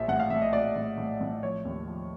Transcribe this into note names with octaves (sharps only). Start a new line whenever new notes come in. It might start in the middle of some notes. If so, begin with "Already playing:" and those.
Already playing: A#1 F3 E5
A2 F#5
F5
A2 E5
D#5
A#1 D5
A2
A2
A2
F3 C#5
D#2
F3